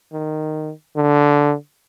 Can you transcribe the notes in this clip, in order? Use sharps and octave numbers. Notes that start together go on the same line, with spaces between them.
D#3
D3